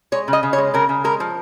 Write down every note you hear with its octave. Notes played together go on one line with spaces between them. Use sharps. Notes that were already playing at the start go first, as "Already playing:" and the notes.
G#3 C#5
C#3
D#5
C#3
C#5
G#3
C#3 A#4
C#3
G#3 A#4
F3